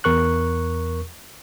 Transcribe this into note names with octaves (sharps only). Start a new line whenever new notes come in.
E2 A#4 C#6 F#6